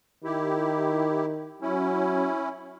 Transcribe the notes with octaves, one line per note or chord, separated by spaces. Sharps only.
D#3 E4 G4
F#3 C#4 E4